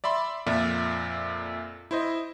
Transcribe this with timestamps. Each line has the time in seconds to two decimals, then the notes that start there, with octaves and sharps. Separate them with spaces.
0.04 D5 E5 B5 C6
0.46 F2 A#2 A#4 D5 E5
1.91 E4 C5 D#5